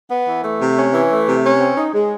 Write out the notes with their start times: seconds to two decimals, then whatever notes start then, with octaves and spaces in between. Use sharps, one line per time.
0.10 B3
0.27 E3
0.43 A3
0.60 C3
0.77 C#4
0.94 E3
1.10 A3
1.27 C3
1.44 C#4
1.60 C4
1.77 D#4
1.94 G#3